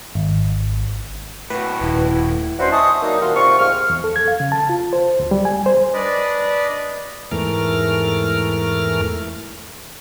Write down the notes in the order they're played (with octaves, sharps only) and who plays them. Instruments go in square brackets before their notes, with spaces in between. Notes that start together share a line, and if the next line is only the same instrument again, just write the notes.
[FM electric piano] G#1
[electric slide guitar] A2 F#4 [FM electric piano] B4
[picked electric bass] D#1 [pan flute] E4
[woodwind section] C#4 D4 E4 F#4 B4 C5
D#5 E5 G#5 A5 C#6 D#6
F#3 A#3 D4 D#4
A#2 D#3 G3 F#4 F5 C6
C3 C4 F4 C#6
C2 G#2 F6
[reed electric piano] E2
A4
G#6
F5
C#3
A5
F4
C5
D2
G3
G#5
C5
[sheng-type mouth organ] D4 B4 D5 D#5
[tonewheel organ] E2 G#2 E3 A3 A#4 F6